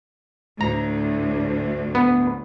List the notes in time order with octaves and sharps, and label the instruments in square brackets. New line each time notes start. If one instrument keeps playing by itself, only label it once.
[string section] D2 A2 [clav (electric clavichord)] A#5
[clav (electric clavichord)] B3